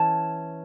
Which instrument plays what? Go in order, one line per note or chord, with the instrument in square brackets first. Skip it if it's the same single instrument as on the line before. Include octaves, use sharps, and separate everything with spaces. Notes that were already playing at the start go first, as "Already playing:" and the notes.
Already playing: [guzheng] E3 C#4 A5